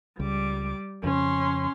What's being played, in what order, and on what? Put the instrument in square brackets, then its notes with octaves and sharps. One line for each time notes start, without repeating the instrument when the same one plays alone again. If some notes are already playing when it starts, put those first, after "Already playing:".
[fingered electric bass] C#2 [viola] G3 D6
[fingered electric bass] F2 C#3 [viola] C#4 C6